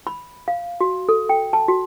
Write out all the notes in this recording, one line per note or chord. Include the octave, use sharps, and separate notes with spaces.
B5
F5
F#4
A4
G5
A5
F#4